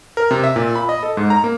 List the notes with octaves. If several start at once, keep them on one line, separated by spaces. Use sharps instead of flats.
A#4
C3
E5
A#2
B5
D#5
A4
G#2
A#5
A#3